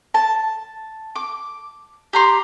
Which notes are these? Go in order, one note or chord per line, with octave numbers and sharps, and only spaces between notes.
A5
D6
G4 A#5 C6